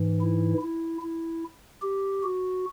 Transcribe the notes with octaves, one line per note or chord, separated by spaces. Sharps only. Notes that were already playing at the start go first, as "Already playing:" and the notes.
Already playing: G#2 E3
E4
E4
E4
G4
F#4